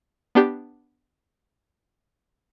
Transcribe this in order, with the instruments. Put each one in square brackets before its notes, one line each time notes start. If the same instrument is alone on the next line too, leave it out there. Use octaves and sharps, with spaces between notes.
[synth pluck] B3 D4 G4